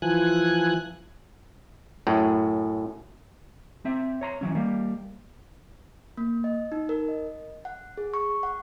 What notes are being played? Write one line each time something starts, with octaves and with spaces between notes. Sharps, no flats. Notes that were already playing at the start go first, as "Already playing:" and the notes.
E3 F3 G#5 F#6
F#2 A2
C4 E5
C#5 A#5 C6
E3 F#3 C#4
G3 A#3
A#3
D#5
D#4
A#4
D#5
F#5
G#4
C#6
F#5